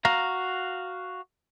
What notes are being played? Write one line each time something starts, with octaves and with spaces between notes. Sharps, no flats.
F#4 F5 A#5